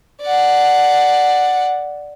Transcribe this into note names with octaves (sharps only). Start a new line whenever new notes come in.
D5 F#5